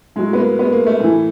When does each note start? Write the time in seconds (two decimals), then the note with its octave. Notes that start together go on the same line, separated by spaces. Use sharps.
0.16 A2 F#3 G#3
0.33 B3
0.37 A#3
0.59 B3
0.72 A#3
0.86 A3
1.00 A2 E3